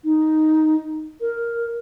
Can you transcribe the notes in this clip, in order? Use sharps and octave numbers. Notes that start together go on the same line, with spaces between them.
D#4
A#4